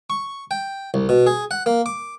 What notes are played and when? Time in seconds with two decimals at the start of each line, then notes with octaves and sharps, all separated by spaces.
0.10 C#6
0.51 G5
0.94 C2
1.09 B2
1.27 G#4
1.51 F#5
1.66 A#3
1.86 D6